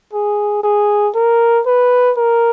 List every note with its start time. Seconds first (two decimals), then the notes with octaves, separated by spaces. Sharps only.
0.13 G#4
0.63 G#4
1.15 A#4
1.67 B4
2.18 A#4